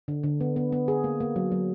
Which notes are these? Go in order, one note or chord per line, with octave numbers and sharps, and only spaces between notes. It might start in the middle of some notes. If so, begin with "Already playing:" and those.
D3
D3
B3
B3
B3
G#4
A#3
A#3
F#3
F#3